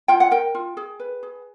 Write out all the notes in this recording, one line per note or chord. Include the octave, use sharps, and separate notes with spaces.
F4 G5
F#5
A#4 G5
F4
G#4
B4
G#4